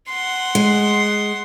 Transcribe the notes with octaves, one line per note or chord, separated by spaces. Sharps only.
F#5 C6
G#3